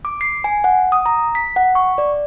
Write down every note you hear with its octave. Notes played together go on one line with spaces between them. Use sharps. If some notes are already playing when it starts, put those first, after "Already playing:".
D6
C7
G#5
F#5
D#6
A#5
B6
F#5
C#6
D5